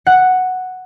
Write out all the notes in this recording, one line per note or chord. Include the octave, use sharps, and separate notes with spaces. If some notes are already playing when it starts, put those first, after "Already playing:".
F#5